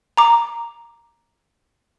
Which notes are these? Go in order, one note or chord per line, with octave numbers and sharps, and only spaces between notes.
A#5 D6